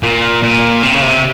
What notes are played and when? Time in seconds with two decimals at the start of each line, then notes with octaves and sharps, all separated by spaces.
0.03 A#2
0.43 A#2
0.83 C3
0.93 C#3
1.02 C3